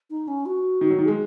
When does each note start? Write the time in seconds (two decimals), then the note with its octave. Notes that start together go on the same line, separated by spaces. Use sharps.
0.10 D#4
0.28 C#4
0.46 F#4
0.81 D#3
0.90 F#3
0.98 D#3
1.05 G#3 G#4